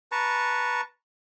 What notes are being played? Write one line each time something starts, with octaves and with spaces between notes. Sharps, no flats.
B4 A5 A#5 C#6